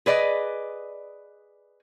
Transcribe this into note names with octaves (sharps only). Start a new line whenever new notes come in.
G#4 B4 D5 D#5